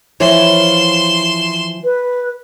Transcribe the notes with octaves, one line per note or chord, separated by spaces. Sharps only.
E3 F3 C#5 C6 E7
B4